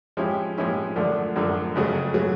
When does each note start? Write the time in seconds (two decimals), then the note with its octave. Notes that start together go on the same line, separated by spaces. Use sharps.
0.17 F3 G#3 C#4 E4 G4
0.57 F3 G#3 C#4 E4 G4
0.96 F#2 D3 F3 A3 D4
1.36 F#2 D3 F3 A3 D4
1.75 F2 C#3 F#3 A3
2.14 C#3 F#3 A3